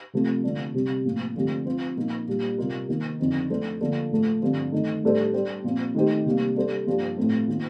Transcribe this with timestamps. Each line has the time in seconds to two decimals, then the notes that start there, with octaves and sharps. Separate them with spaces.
0.13 C3 F3 A3 C4 F4
0.44 D3 F3 A3 D4
0.74 C3 G3 C4
1.05 A2 F3 A#3
1.36 D3 F3 A3 C4 G4
1.66 F3 C4 F4 C5
1.97 A#2 F3 A#3 D#4 A#4
2.28 A#2 G3 D4
2.58 C3 G3 C4 F4 A#4
2.88 D#3 A#3 D#4 A#4
3.19 F2 D3 F3 C4 D#4
3.50 F3 A3 D4 A4 C5
3.81 D3 F3 A#3 D4 A4
4.11 A2 F3 A3
4.42 G2 D3 F3 C4
4.72 D#3 A3 D#4
5.03 A2 G3 D4 A4 C5
5.34 G3 D4 G4 C5
5.64 A#2 F3 C4
5.95 D#3 A3 D#4 G4 C5
6.25 C3 G3 A#3
6.56 G3 D4 A4 C5
6.87 G2 F3 A#3 D4 G4
7.17 A2 F3 A3 C4
7.48 D#3 A#3 F4